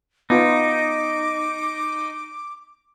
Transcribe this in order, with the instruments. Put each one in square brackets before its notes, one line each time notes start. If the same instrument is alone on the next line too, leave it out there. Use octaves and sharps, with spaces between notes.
[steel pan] B3 F4 [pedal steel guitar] D#4 [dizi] D6